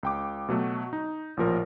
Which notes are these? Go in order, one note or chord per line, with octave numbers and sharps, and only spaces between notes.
C#2 G5 D6
B2 F#3 A3
D#4
A1 A#2 F3 A#4